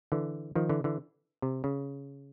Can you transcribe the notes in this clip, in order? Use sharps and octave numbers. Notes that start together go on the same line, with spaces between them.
D3 E3
D#3 F3
D3 E3
D3 E3
C3
C#3